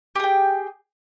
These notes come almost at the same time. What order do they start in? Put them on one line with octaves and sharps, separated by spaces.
G4 G#4 G5